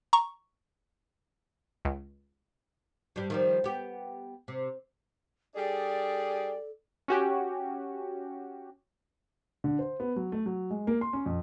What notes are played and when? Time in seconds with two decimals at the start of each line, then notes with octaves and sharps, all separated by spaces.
0.13 A#5 C#6
1.85 C#2
3.16 G2 G3
3.30 D#3 F3 G3
3.64 B3 G4
4.48 C3
5.55 G3 D4 G#4 A4 D5
7.08 C#4 F#4 G4
9.64 D3
9.79 C5
10.00 B3
10.16 F#3
10.32 A3
10.46 F#3
10.70 G#3
10.87 A#3
11.01 C6
11.13 C#4
11.26 F2